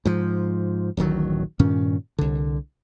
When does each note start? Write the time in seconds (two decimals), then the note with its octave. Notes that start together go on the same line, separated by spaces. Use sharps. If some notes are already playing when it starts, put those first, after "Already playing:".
0.05 G#2 F3
0.97 D1 A1 D#3 F#3
1.59 G2 A#2 D#3 C#4
2.18 C2 D3